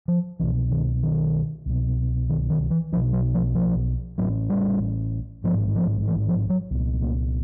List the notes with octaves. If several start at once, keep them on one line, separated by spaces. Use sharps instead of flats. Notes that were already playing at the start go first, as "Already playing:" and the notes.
F3
C2 B2 E3
D#3
D#3
C2 B2
D#3
D#3
E3
B1 B2 F3
F#3
F3
F3
A1 A2 F#3
G3
A1 G#2 F3
F3
E3
F3
F#3
C2 A#2
A#3